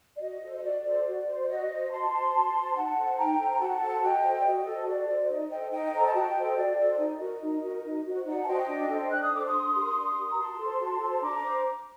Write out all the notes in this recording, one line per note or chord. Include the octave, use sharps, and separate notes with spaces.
D5
F#4 D#5
A4 C5
D#5
F#4 D5
A4 C5
F#4
C5
D5
F#4 D#5
C5
F#4 A5 C6
C5
F#4
C5
D#4 F#5 A5
A4 C5
D#4 G5 A#5
A4 C5
A#5
F#4 F#5 A5
A4 C5
F#4 D#5 G5
A4 C5
D5
F#4 D#5
A4 C5
F#4 D5
A4 C5
D#4 D#5
A4 C5 D#5 G5
D#4 D#5 G5
A4 C5 A#5
A5
F#4 D#5 G5
A4 C5
D#5
F#4 D5
A4 C5
D#4 D#5
D5
F#4 A#4 D#5
D#4
F#4 A#4
D#4
F#4 C5
D#4 D5 F#5
A5
F#4 C5 D#5 G5
D4
A4 C5
D4 F#6
D#6
A4 C5 D6
C6 D#6
D4
G4 A#4
D4
G4 A#4
A#5
F#4 A5 C6
A4 C5
F#4
A4 C5
D4 A#5 D6
C5